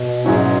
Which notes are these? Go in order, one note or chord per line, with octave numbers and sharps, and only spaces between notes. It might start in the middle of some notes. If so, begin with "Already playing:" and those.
Already playing: B2
G#2 F#3 C#4 E4